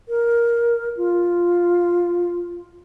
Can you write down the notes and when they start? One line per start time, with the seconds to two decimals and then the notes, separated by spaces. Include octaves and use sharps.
0.09 A#4
0.97 F4